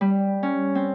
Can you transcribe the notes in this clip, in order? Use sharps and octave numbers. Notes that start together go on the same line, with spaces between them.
G3
C#4
C4